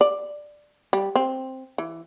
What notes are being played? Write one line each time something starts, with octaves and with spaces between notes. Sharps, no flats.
D5
G3
C4
E3